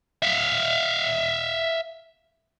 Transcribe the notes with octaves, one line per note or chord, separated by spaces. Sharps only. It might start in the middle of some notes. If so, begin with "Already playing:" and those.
E5 F5